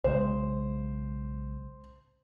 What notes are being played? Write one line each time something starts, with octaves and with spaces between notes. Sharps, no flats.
B1 C#3 G#3 C5